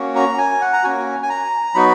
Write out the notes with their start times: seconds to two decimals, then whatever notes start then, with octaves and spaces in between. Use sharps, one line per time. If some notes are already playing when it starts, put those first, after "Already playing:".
Already playing: A#3 C#4 F#4
0.16 A#5
0.38 G#5
0.61 F#5
0.73 A#5
0.83 A#3 C#4 F#4 G#5
1.23 G#5
1.30 A#5
1.74 F#3 B3 D#4 F#4 B5